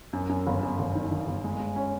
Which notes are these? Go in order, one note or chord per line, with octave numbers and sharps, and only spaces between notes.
F#2
F#2
G1
F#2
G1
D#3
D#3
G1
G#3
G#3
C#4